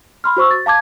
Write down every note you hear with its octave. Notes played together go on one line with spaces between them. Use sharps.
B5 C6 F6
F#4 C5 C#6 E6
A6
F5 A5 D6 G#6